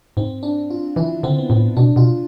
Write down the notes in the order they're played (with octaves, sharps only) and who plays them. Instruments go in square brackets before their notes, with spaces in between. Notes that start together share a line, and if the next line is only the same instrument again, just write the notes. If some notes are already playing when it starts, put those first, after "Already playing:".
[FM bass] G#2 [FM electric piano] C4
[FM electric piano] D4
F4
[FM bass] E3 [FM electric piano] E4
[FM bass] D3 [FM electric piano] C4
[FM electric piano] B3
[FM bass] A2 [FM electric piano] C4
[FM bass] B2 [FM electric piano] D4
[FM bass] B2 [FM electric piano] F4